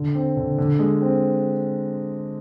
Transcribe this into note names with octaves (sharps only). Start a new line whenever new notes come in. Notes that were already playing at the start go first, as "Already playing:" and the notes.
Already playing: D3
C4
D3
D3
G#3
C4